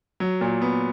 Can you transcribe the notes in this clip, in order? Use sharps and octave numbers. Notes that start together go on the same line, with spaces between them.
F#3
A#2
B3